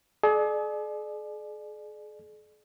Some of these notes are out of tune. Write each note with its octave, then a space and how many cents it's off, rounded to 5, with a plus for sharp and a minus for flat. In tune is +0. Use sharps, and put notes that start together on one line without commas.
G#4 +40 D5 +35